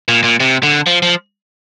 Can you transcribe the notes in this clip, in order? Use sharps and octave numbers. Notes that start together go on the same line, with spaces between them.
A#2
A#2
C3
D3
F3
F3